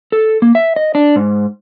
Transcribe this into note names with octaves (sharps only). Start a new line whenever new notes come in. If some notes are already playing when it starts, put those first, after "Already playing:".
A4
A#3
E5
D#5
D4
G#2